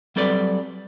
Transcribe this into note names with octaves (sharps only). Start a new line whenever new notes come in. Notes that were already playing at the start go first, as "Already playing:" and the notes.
F#3 G3 C4 A4 B4 D5